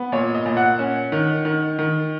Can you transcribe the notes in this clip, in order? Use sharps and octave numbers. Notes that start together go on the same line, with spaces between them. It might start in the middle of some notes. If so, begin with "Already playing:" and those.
Already playing: B3
A#2 C#5
D#5
A#2
F#5
C#4
D#3
D#3
D#3